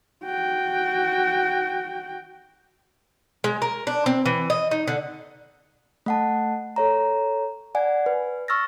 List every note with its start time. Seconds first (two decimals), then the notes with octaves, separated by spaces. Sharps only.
0.24 F#4 G5
3.44 G#3
3.62 A#4
3.87 D4
4.06 C4
4.26 E3
4.50 D#5
4.71 D#4
4.87 D3
6.06 A3 F#5 A5
6.76 A4 C#5 A#5
7.75 D5 F#5 G#5
8.06 B4
8.48 C#6 E6 F6 A6 A#6